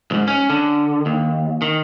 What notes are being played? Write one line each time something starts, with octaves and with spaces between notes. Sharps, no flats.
C2 G#2
C#4
D3
D#2
D#3